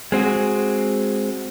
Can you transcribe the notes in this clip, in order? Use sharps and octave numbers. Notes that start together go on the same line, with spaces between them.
G#3 C4 F#4 G#4